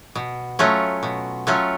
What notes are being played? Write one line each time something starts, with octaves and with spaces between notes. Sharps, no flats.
B2
F#3 A3 C#4 F4
B2
F#3 A3 C#4 F4